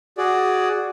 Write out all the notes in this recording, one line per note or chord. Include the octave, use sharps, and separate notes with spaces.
F#4 G#4 D5